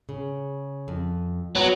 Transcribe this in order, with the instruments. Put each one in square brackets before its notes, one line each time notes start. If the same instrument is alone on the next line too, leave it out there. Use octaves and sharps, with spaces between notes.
[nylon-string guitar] C#3
F2
[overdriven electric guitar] F#3 [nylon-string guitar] B3 F#5